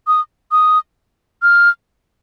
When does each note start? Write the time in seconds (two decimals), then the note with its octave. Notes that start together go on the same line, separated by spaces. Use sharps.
0.07 D#6
0.52 D#6
1.42 F6